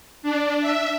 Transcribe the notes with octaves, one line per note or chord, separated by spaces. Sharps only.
D4
E5